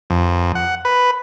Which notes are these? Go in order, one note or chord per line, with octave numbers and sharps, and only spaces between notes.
F2
F#5
B4